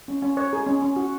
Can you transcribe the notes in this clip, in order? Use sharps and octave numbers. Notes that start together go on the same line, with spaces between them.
C#4
C#4
C#5
G#4
C#4
C#4
F#4